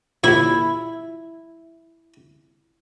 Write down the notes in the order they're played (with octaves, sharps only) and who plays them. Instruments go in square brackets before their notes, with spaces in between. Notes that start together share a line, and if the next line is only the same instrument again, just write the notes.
[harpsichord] D#2 A#2 [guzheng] E4